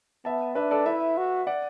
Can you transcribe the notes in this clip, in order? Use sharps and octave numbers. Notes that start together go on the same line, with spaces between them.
B3 E5 A5
D4 B4 E5
A4 D5
E4 B4 E5
F#4
D5 F#5